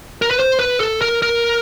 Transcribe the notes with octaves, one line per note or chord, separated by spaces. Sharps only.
A#4
B4
C5
B4
A4
A#4
A#4